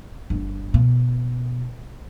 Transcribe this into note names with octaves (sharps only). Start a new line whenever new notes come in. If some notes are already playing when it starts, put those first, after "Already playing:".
G1
B2